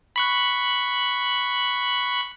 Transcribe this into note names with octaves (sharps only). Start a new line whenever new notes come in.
B5 C#6 F#6